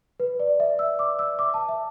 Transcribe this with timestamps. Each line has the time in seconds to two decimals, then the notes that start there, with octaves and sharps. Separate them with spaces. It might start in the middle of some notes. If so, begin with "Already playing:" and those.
0.20 B4
0.40 D5
0.60 E5
0.79 E6
0.99 D6
1.19 E6
1.39 D6
1.54 A5
1.69 E5